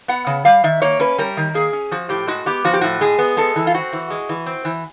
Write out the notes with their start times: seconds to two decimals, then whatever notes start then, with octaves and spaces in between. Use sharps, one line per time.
0.08 B3 F#5
0.27 C#3
0.45 G3 F5
0.64 D#3 E5
0.82 A#3 C#5
1.00 C#4 B4
1.18 G3 A#4
1.37 D#3
1.54 A#3 G#4
1.73 C#4
1.91 F3 F#4
2.09 A2 G4
2.27 G#3 F#4
2.46 B3 G4
2.65 F3 F#4
2.74 G4
2.81 A2 F#4
3.01 G#3 G#4
3.19 B3
3.37 G#3 A4
3.56 E3
3.67 F4
3.74 C4 F#4
3.93 E3
4.10 G#3
4.29 E3
4.46 C4
4.65 E3